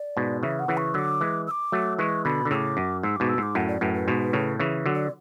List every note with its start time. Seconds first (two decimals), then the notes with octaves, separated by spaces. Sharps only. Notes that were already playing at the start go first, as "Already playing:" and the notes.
Already playing: D5
0.16 G#2 B2
0.43 C#3 E3 E5
0.60 F#5
0.68 C#3 E3
0.77 C#6
0.94 D3 F#3 E6
0.99 D6
1.21 E3 G#3
1.47 E6
1.51 D6
1.72 F#3 A3
1.98 E3 G#3 C#6
2.25 B2 D3 B5
2.45 D3
2.51 A2 C#3 D6 E6
2.77 F#2
3.03 G#2 E6
3.16 G#2 B2 D6
3.29 E6
3.38 G#2 D6
3.55 F#2 A2 F#5
3.68 D5
3.81 F#2 A2 B4
3.94 B4
4.08 G#2 B2
4.33 A2 C#3
4.59 C#3 E3
4.86 D3 F#3
4.95 D5